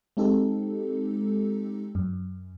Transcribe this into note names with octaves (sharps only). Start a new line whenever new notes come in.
G#3 C4 D#4 G4 A4
F#2